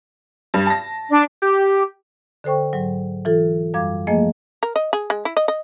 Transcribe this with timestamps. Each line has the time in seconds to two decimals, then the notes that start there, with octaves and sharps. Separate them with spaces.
0.54 G2
0.66 A5 A#6
1.10 D4
1.42 G4
2.44 D3 A4 C5 G5 C#6
2.73 G#2 F#3
3.25 E3 F4 A4
3.74 F#2 G3 F5 D6 G#6
4.07 F3 A3 A#3 G#4 D#5 G#5
4.63 A#4
4.76 D#5
4.93 G#4
5.10 G#3
5.25 E4
5.37 D#5
5.48 D#5